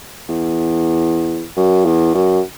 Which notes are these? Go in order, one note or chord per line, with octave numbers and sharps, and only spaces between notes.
E2
F#2
E2
F#2